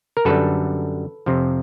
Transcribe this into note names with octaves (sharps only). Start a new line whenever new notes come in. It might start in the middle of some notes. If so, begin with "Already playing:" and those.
A#4
F#2 D3 G3 A4 B4
F2 C3 F3